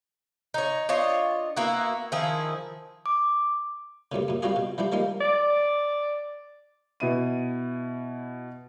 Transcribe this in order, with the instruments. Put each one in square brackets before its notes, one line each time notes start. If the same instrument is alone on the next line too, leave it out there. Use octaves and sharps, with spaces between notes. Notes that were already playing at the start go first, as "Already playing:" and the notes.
[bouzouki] D#4 C#5
D4 F4 C#5 D#5
A#3 B3 E4 F#4
D#3 F3 E4 G#4
[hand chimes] D6
[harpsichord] D2 G2 A#2 C#3
F#2 A#2
G3 C4 F4 F#4 G#4
B2
E3 F3 G3 D4
D#3 F3 G3 G#3 A#3
[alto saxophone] D5
[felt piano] B2 E4 D#7